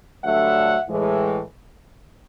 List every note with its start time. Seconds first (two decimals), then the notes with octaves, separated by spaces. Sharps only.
0.24 G2 D3 F#3 A3 E5 F#5
0.89 A2 E3 G#3